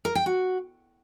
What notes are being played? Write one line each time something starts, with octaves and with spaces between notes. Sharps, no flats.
A#4
G5
F#4